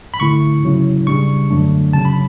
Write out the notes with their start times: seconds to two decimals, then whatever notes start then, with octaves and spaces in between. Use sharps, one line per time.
0.14 B5
0.20 D3 A3 E4 C#6
0.63 C#3 F#3 C#4 E4
1.06 C#3 G3 D4 C#6
1.50 F#2 D3 F#3 A3 D4
1.93 C#3 F#3 C#4 A5
2.05 B5